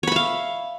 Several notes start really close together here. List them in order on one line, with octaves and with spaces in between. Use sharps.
C#5 B5 E5 F5